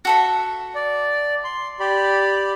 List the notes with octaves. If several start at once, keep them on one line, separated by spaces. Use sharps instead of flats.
F#4 A4 E5
D5
C6
G4 D5 B5